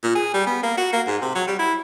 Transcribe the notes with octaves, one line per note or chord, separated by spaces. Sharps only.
A#2
G#4
G3
B3
A#3
F#4
A#3
G#2
C3
F#3
G3
E4